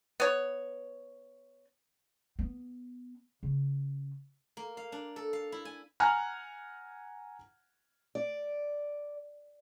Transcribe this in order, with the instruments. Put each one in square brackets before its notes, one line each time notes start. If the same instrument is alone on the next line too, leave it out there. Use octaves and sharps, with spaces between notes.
[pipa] B3 C#5
[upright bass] B3
C#3
[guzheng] A#3
F5
D4
A4
F5
E4
G#5
[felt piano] F#5 G#5 A#5 F6 F#6
[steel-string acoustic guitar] D5